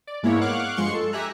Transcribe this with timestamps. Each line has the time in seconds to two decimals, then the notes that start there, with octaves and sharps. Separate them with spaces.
0.07 D5
0.23 G#2 G#3 A#3 B3 E4 C#5
0.41 F5 F#5 C#6 D6 F#6
0.77 G2 F3 G#3 C6 C#6 C#7
0.94 A4
1.12 G4 E5 G#5 A#5 F#6